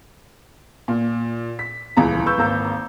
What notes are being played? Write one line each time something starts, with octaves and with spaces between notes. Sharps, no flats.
A#2
B6
D#1 C#2 E3 A#5
B4 C#6 E6 G6
G#1 A#3 A#5 E6 G6